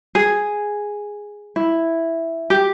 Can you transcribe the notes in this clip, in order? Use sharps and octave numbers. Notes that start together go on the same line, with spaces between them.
G#4
E4
G4